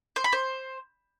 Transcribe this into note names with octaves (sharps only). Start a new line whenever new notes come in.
C5
B5
C5